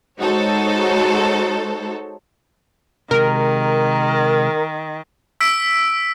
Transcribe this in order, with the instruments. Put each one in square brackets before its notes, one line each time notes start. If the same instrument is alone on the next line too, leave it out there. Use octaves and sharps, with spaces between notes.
[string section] G#3 D#4 F#4 A4 C5 C#5
[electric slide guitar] C3 G#3 G4 [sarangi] D#3 [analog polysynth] A#4
[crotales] E6 B6 D7